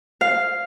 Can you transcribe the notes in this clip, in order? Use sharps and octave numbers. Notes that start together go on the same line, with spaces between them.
F5